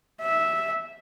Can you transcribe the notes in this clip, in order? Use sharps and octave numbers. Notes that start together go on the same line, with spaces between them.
E5